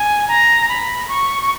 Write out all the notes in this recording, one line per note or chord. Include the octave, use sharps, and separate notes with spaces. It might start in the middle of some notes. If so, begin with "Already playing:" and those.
Already playing: G#5
A#5
B5
C#6